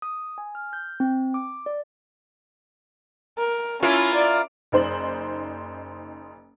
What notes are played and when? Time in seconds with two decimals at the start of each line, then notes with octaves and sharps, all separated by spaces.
0.02 D#6
0.38 G#5
0.55 F6
0.73 G6
1.00 C4
1.34 D6
1.66 D5
3.38 A#4
3.83 A#3 C#4 E4 F4
4.15 D5
4.72 F#1 D#4 C5 D5 F#7